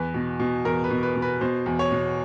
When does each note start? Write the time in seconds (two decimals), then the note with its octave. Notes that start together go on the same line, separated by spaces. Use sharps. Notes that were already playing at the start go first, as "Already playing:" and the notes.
Already playing: E2 B4
0.14 B2
0.40 B2
0.65 E2 A#4
0.84 B4
0.90 B2
1.03 B4
1.16 B2
1.22 B4
1.41 B2 C5
1.66 E2
1.79 C#5
1.92 B2